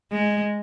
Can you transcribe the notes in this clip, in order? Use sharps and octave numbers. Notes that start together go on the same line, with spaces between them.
G#3